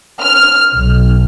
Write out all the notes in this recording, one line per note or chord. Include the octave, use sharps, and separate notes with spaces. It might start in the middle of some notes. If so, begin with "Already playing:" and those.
F6
B1